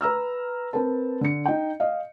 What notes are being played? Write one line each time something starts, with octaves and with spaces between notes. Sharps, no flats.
B4 A#5 E6 F6
C4 A#4 B4 A5
D3 C#7
D#4 G5
D#5 F5